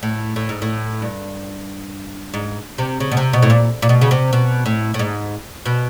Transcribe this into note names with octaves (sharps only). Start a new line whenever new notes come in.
A2
A2
G#2
A2
G2
G#2
C3
C#3
B2
C3
B2
A2
A#2
A#2
B2
C#3
C3
B2
A2
A2
G#2
B2